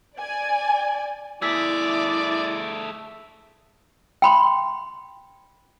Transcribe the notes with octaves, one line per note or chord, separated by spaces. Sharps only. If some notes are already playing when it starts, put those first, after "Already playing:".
D5 G#5
A3 E4 G#4 D5 E6 B6
G5 B5 C6